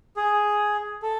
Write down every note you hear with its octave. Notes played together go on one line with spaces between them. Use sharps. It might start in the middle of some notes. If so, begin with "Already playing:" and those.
G#4
A4